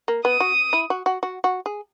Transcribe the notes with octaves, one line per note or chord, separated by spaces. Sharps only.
A#3
B3 D#6
F#4
E4
F#4
F#4
F#4
F#4
G#4